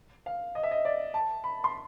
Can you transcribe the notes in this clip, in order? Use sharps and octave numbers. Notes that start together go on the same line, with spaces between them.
F5
D#5
E5
D#5
D5
A5
B5
C6